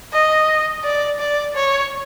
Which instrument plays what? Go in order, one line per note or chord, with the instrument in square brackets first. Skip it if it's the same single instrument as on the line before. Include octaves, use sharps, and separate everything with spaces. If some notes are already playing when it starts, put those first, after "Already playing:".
[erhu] D#5
D5
D5
C#5